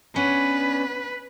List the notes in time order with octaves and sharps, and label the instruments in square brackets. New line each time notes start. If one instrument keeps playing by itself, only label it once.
[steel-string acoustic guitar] B3 C#4 D4 [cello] B4